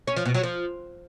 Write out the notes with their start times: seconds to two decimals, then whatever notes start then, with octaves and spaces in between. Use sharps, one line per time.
0.07 C#4
0.16 F3
0.25 B2
0.34 F#3
0.43 F3